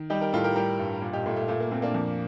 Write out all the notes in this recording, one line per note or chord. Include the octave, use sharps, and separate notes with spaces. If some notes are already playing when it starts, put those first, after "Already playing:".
Already playing: D#3
G3 D#4 G4
G4 A#4
A2 F4 A4
G4 A#4
G3 G4 A#4
G2
A#2
D#4 G4
A#2 A3
A3
A#2 A3
A#3
A#2 A3 C4
A#3 D4
F2